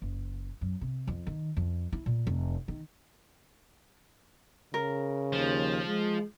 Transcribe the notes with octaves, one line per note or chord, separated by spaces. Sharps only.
F#1
F#2
C3
F2
D#3
F2
E4
A#2
F1
D#3
C#3 A#4
D#2 F3
G#3